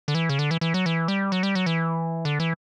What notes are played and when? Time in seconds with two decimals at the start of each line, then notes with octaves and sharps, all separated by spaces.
0.08 D3
0.15 E3
0.29 C#3
0.39 D3
0.51 E3
0.61 E3
0.74 F#3
0.86 E3
1.08 G3
1.32 F#3
1.43 G3
1.55 F#3
1.66 E3
2.25 D3
2.40 E3